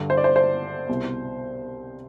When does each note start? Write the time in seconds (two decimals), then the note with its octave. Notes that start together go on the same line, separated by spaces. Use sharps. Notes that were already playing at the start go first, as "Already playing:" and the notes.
Already playing: G2 D3
0.10 C5
0.17 D5
0.24 C5
0.36 C5
0.89 C2 B2